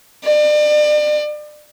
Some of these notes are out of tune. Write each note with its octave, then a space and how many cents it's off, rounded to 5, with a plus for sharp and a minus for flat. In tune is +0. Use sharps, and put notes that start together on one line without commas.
D5 +35